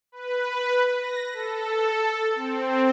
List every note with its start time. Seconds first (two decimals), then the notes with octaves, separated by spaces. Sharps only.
0.12 B4
1.00 A#6
1.33 A4
2.35 C4